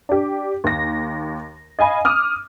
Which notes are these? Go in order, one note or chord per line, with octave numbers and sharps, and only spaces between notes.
D4 G4
D#2 A#6
D#5 F5 G#5 B5
D6 D#6 F6